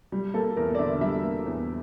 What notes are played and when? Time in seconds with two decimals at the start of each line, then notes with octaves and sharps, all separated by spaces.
0.12 G3
0.34 A#3 A4
0.57 E2 A#4
0.75 D5
0.79 D3 E5
1.01 G3 E5
1.23 A#3
1.46 E2